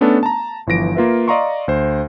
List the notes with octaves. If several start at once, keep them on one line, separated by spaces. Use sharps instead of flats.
A3 B3 C#4 D4 A4
A5 A#5
G1 E3 F3 A#6 D7
A#3 F4 B4 E5
D5 D#5 F5 A#5 C6 C#6
D2 C5